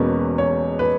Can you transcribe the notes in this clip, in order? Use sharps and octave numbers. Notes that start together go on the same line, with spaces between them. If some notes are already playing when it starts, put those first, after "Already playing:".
Already playing: E1 E2 B2 A#3 C#4 B4
C#5
B4